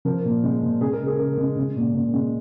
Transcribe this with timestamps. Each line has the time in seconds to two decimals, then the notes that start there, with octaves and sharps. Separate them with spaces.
0.05 F3 A#4
0.25 A#2
0.44 G#3
0.62 A#2
0.81 G#3 G#4
0.93 A#4
1.00 C#3
1.07 G#4
1.19 C#3 A#4
1.38 G#3
1.57 G#3
1.76 A#2
1.94 A#2
2.14 G#3